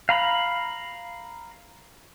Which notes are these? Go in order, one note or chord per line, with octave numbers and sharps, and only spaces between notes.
F5 A#5 B5